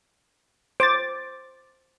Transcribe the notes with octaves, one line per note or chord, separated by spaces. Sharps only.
C5 D6 A6